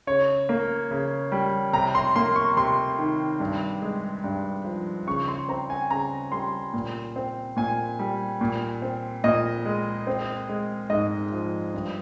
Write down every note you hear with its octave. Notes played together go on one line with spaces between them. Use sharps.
C#3 C#5
A#3
C#3
G3
C3 A#5
C6
A#3 C6
C#6
C3 C6
D#3
G2
G#3
G2
F3
C#3 C#6
C6
C4 A#5
G#5
C#3 A#5
G3 C6
A#2
C4
A#2 G#5
G3
A#2
C4
A#2 D#5
G#3
C4
G#3
G#2 D#5
F3
G2